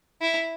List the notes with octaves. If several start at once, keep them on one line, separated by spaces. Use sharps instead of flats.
E4